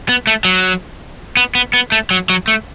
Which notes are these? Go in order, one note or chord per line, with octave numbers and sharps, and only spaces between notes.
B3
A3
F#3
B3
B3
B3
A3
F#3
F#3
A3